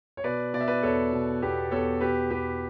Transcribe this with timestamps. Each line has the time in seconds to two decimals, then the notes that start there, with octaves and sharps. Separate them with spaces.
0.17 C#5
0.24 B2 B4 D5
0.54 B2 D5
0.60 E5
0.68 B4 D5
0.83 E2 A4 C#5
1.13 B2
1.42 E2 G4 B4
1.71 E2 A4 C#5
2.00 B2 G4 B4
2.30 E2 G4 B4